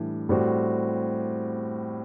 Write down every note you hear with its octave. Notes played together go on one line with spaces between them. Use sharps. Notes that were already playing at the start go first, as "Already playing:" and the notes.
Already playing: A2 E3 G3 D4
A2 G3 C4 F#4